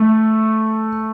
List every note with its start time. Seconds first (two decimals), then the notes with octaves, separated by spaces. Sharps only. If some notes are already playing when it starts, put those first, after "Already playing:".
Already playing: A3